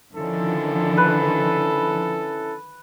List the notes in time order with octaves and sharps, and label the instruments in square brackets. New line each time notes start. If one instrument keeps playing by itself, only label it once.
[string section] D3 D#3 F3 [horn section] C#4 E4 A4
[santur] B4